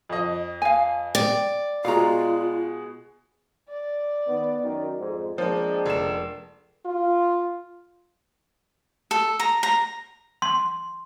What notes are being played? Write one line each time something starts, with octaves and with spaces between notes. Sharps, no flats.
F2 D#5
F5 G#5
D5 G5
B2 G#3 F4 F5 A#5
D5
D#3 B3
F#2 D#3
F2 G#2
F3 G#3 A#3 C4 D4
F1 D5 E7
F4
A4
A#5
A#5
C6